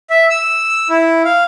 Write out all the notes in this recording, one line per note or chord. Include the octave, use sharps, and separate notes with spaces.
E5
E6
E4
F5